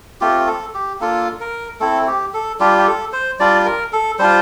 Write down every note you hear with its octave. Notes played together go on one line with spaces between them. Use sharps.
A3 C4 F4 G4
A4
G4
A#3 D4 F4 A4
A#4
A3 C4 E4 A4
G4
A4
G3 D4 F4 G4
G4
A4
C5
G3 D4 F4 D5
A#4
A4
G3 D4 F4 C5